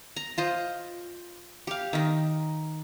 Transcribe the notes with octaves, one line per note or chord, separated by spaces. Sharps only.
A#5
F4 C5 D#5
G4 F5
D#3 D#4